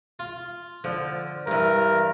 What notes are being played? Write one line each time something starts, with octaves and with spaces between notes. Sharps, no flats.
F4
D3 F3
G2 E3 A#4